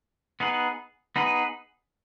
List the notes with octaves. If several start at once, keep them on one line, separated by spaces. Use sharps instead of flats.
B3 D#4 G#4 B4
B3 D#4 G#4 B4